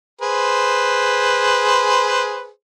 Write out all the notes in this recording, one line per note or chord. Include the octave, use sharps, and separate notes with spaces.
G#4 B4 C5